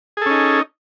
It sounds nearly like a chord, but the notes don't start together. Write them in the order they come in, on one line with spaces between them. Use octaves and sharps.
G#4 A4 C#4 D#4